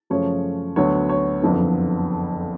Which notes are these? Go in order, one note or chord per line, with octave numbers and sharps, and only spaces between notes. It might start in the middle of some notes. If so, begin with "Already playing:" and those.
F#2 C#3 F3 A3 C#4 C#5
D2 D3 F#3 B3 C#5
C#5
F#1 F2 D3 F3 B3